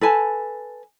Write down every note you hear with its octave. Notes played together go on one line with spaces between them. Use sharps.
A4 B4 G#5 A5